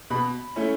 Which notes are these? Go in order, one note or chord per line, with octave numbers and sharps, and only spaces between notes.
B2 B5
A3 C#4 E4